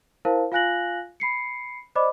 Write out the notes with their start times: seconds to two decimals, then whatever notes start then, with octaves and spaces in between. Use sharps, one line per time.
0.25 E4 A#4 C5 F5 A5
0.52 F4 F5 G#5 F#6 A#6 F#7
1.20 B5 C7 C#7
1.95 C5 D5 D#5 B5 D6